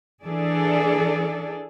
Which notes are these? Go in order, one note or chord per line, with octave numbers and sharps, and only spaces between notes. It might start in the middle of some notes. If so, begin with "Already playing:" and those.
E3 D4 G#4 A4 D5